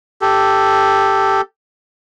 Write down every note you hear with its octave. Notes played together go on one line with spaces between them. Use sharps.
G4 A4